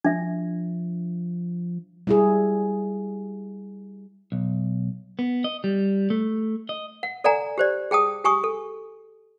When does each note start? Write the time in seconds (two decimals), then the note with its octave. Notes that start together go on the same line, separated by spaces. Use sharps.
0.05 F3 D4 E5
2.07 G3 E4 G#4
4.32 B1
5.19 B3
5.44 D#5
5.64 G3
6.10 A3
6.69 D#5
7.03 F#5
7.24 A4 D5 F#5 G#5 A#5
7.58 G4 C5 D5
7.91 G#4 G5 A5 D#6
8.24 G4 G#5 C#6 D#6
8.44 A4